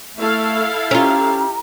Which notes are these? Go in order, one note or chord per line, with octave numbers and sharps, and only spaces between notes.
A3 E4 A4 F5
C#4 F4 G4 A#5